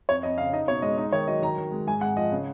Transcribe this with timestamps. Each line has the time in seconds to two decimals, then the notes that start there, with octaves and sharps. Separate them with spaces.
0.09 F2 C#5
0.23 F2 D#5
0.38 C#3 F5
0.53 D#4 D#5
0.68 B2 C#5
0.82 G#3 D#5
0.98 D#4 D#5
1.12 D#3 C#5
1.28 F#3 D#5
1.42 D#3 A#5
1.58 D#3
1.72 G#3
1.87 G#2 G#5
2.01 G#2 F#5
2.16 F3 D#5
2.32 C#3